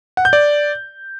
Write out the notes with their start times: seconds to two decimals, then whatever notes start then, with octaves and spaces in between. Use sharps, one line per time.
0.17 F#5
0.25 G6
0.33 D5